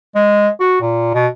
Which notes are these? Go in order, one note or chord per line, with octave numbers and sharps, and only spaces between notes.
G#3
F#4
A#2
B2